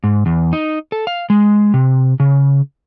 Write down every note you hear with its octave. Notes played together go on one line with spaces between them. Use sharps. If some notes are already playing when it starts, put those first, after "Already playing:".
G#2
E2
D#4
A4
F5
G#3
C3
C#3